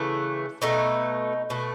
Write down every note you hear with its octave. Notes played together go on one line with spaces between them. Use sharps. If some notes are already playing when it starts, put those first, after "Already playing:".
Already playing: C#3 E3 A3
B2 A3 D#4
B2 A3